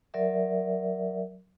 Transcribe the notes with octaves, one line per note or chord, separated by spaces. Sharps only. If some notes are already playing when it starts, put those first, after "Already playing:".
F#3 A#4 D5 E5